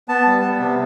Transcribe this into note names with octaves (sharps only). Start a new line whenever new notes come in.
B3 A5
G3
B3
C3